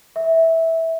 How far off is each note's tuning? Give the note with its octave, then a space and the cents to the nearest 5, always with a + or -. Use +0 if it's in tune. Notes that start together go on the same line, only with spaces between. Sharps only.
E5 -15